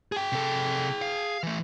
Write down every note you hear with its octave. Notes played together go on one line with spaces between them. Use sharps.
G#4 G5
C3 A4
F5
E3 A3